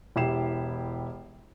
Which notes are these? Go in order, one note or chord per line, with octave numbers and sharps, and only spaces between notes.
E1 E4 G4 C7 E7